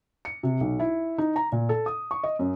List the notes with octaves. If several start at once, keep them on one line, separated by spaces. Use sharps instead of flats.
C#7
C3
B1
E4
D#4
A#5
A#2
A4
D#6
C#6
D#5
F#2